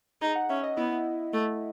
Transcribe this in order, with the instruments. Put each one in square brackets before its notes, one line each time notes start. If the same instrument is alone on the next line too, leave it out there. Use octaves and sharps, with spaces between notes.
[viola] D#4 [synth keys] G#4
[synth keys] F#5
[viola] C#4 [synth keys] E5
[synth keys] D#5
[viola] B3 [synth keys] E4
[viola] A3